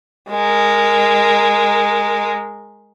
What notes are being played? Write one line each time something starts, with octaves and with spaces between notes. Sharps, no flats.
G#3 A#4